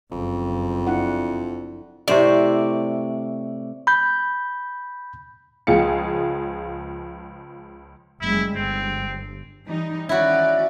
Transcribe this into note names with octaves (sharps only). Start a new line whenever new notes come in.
F#1 F2
D4 E4 F#5
A2 C3 C5 D5 E5 C#6
B5 G6
C#2 F3 G#4 F5 C#7
F#1 G3 G#3 E4
G1 C4
E3 G3 D#4
D#3 C#4 E4 F#4 D5